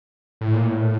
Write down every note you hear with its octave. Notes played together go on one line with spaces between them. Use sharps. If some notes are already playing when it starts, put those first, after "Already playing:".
A2
A#2
A2